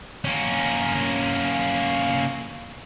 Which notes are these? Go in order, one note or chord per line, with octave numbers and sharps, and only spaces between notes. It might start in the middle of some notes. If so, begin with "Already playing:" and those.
A#3 C#4